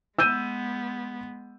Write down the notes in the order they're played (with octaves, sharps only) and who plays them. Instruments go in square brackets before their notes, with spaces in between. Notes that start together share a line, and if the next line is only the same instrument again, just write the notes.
[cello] G#3 B3 [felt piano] E6 G6 D#7